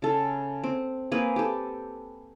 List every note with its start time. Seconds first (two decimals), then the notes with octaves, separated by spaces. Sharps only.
0.02 C#3 A4
0.64 C4
1.12 A#3 C4 G#4 B4
1.36 G4 A4